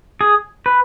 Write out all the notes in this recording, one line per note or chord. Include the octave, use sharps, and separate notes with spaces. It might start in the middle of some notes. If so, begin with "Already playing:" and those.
G#4
B4